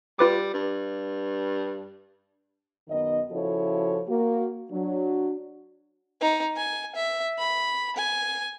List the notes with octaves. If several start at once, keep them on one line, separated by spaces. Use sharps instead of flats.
G3 F4 B4 D6
G2
F#2 D#3 B3 D#4 D#5
C#3 F3 E4 F#4 A4 C#5
A#3 F#4
F#3 D4
D#4
G#5
E5
B5
G#5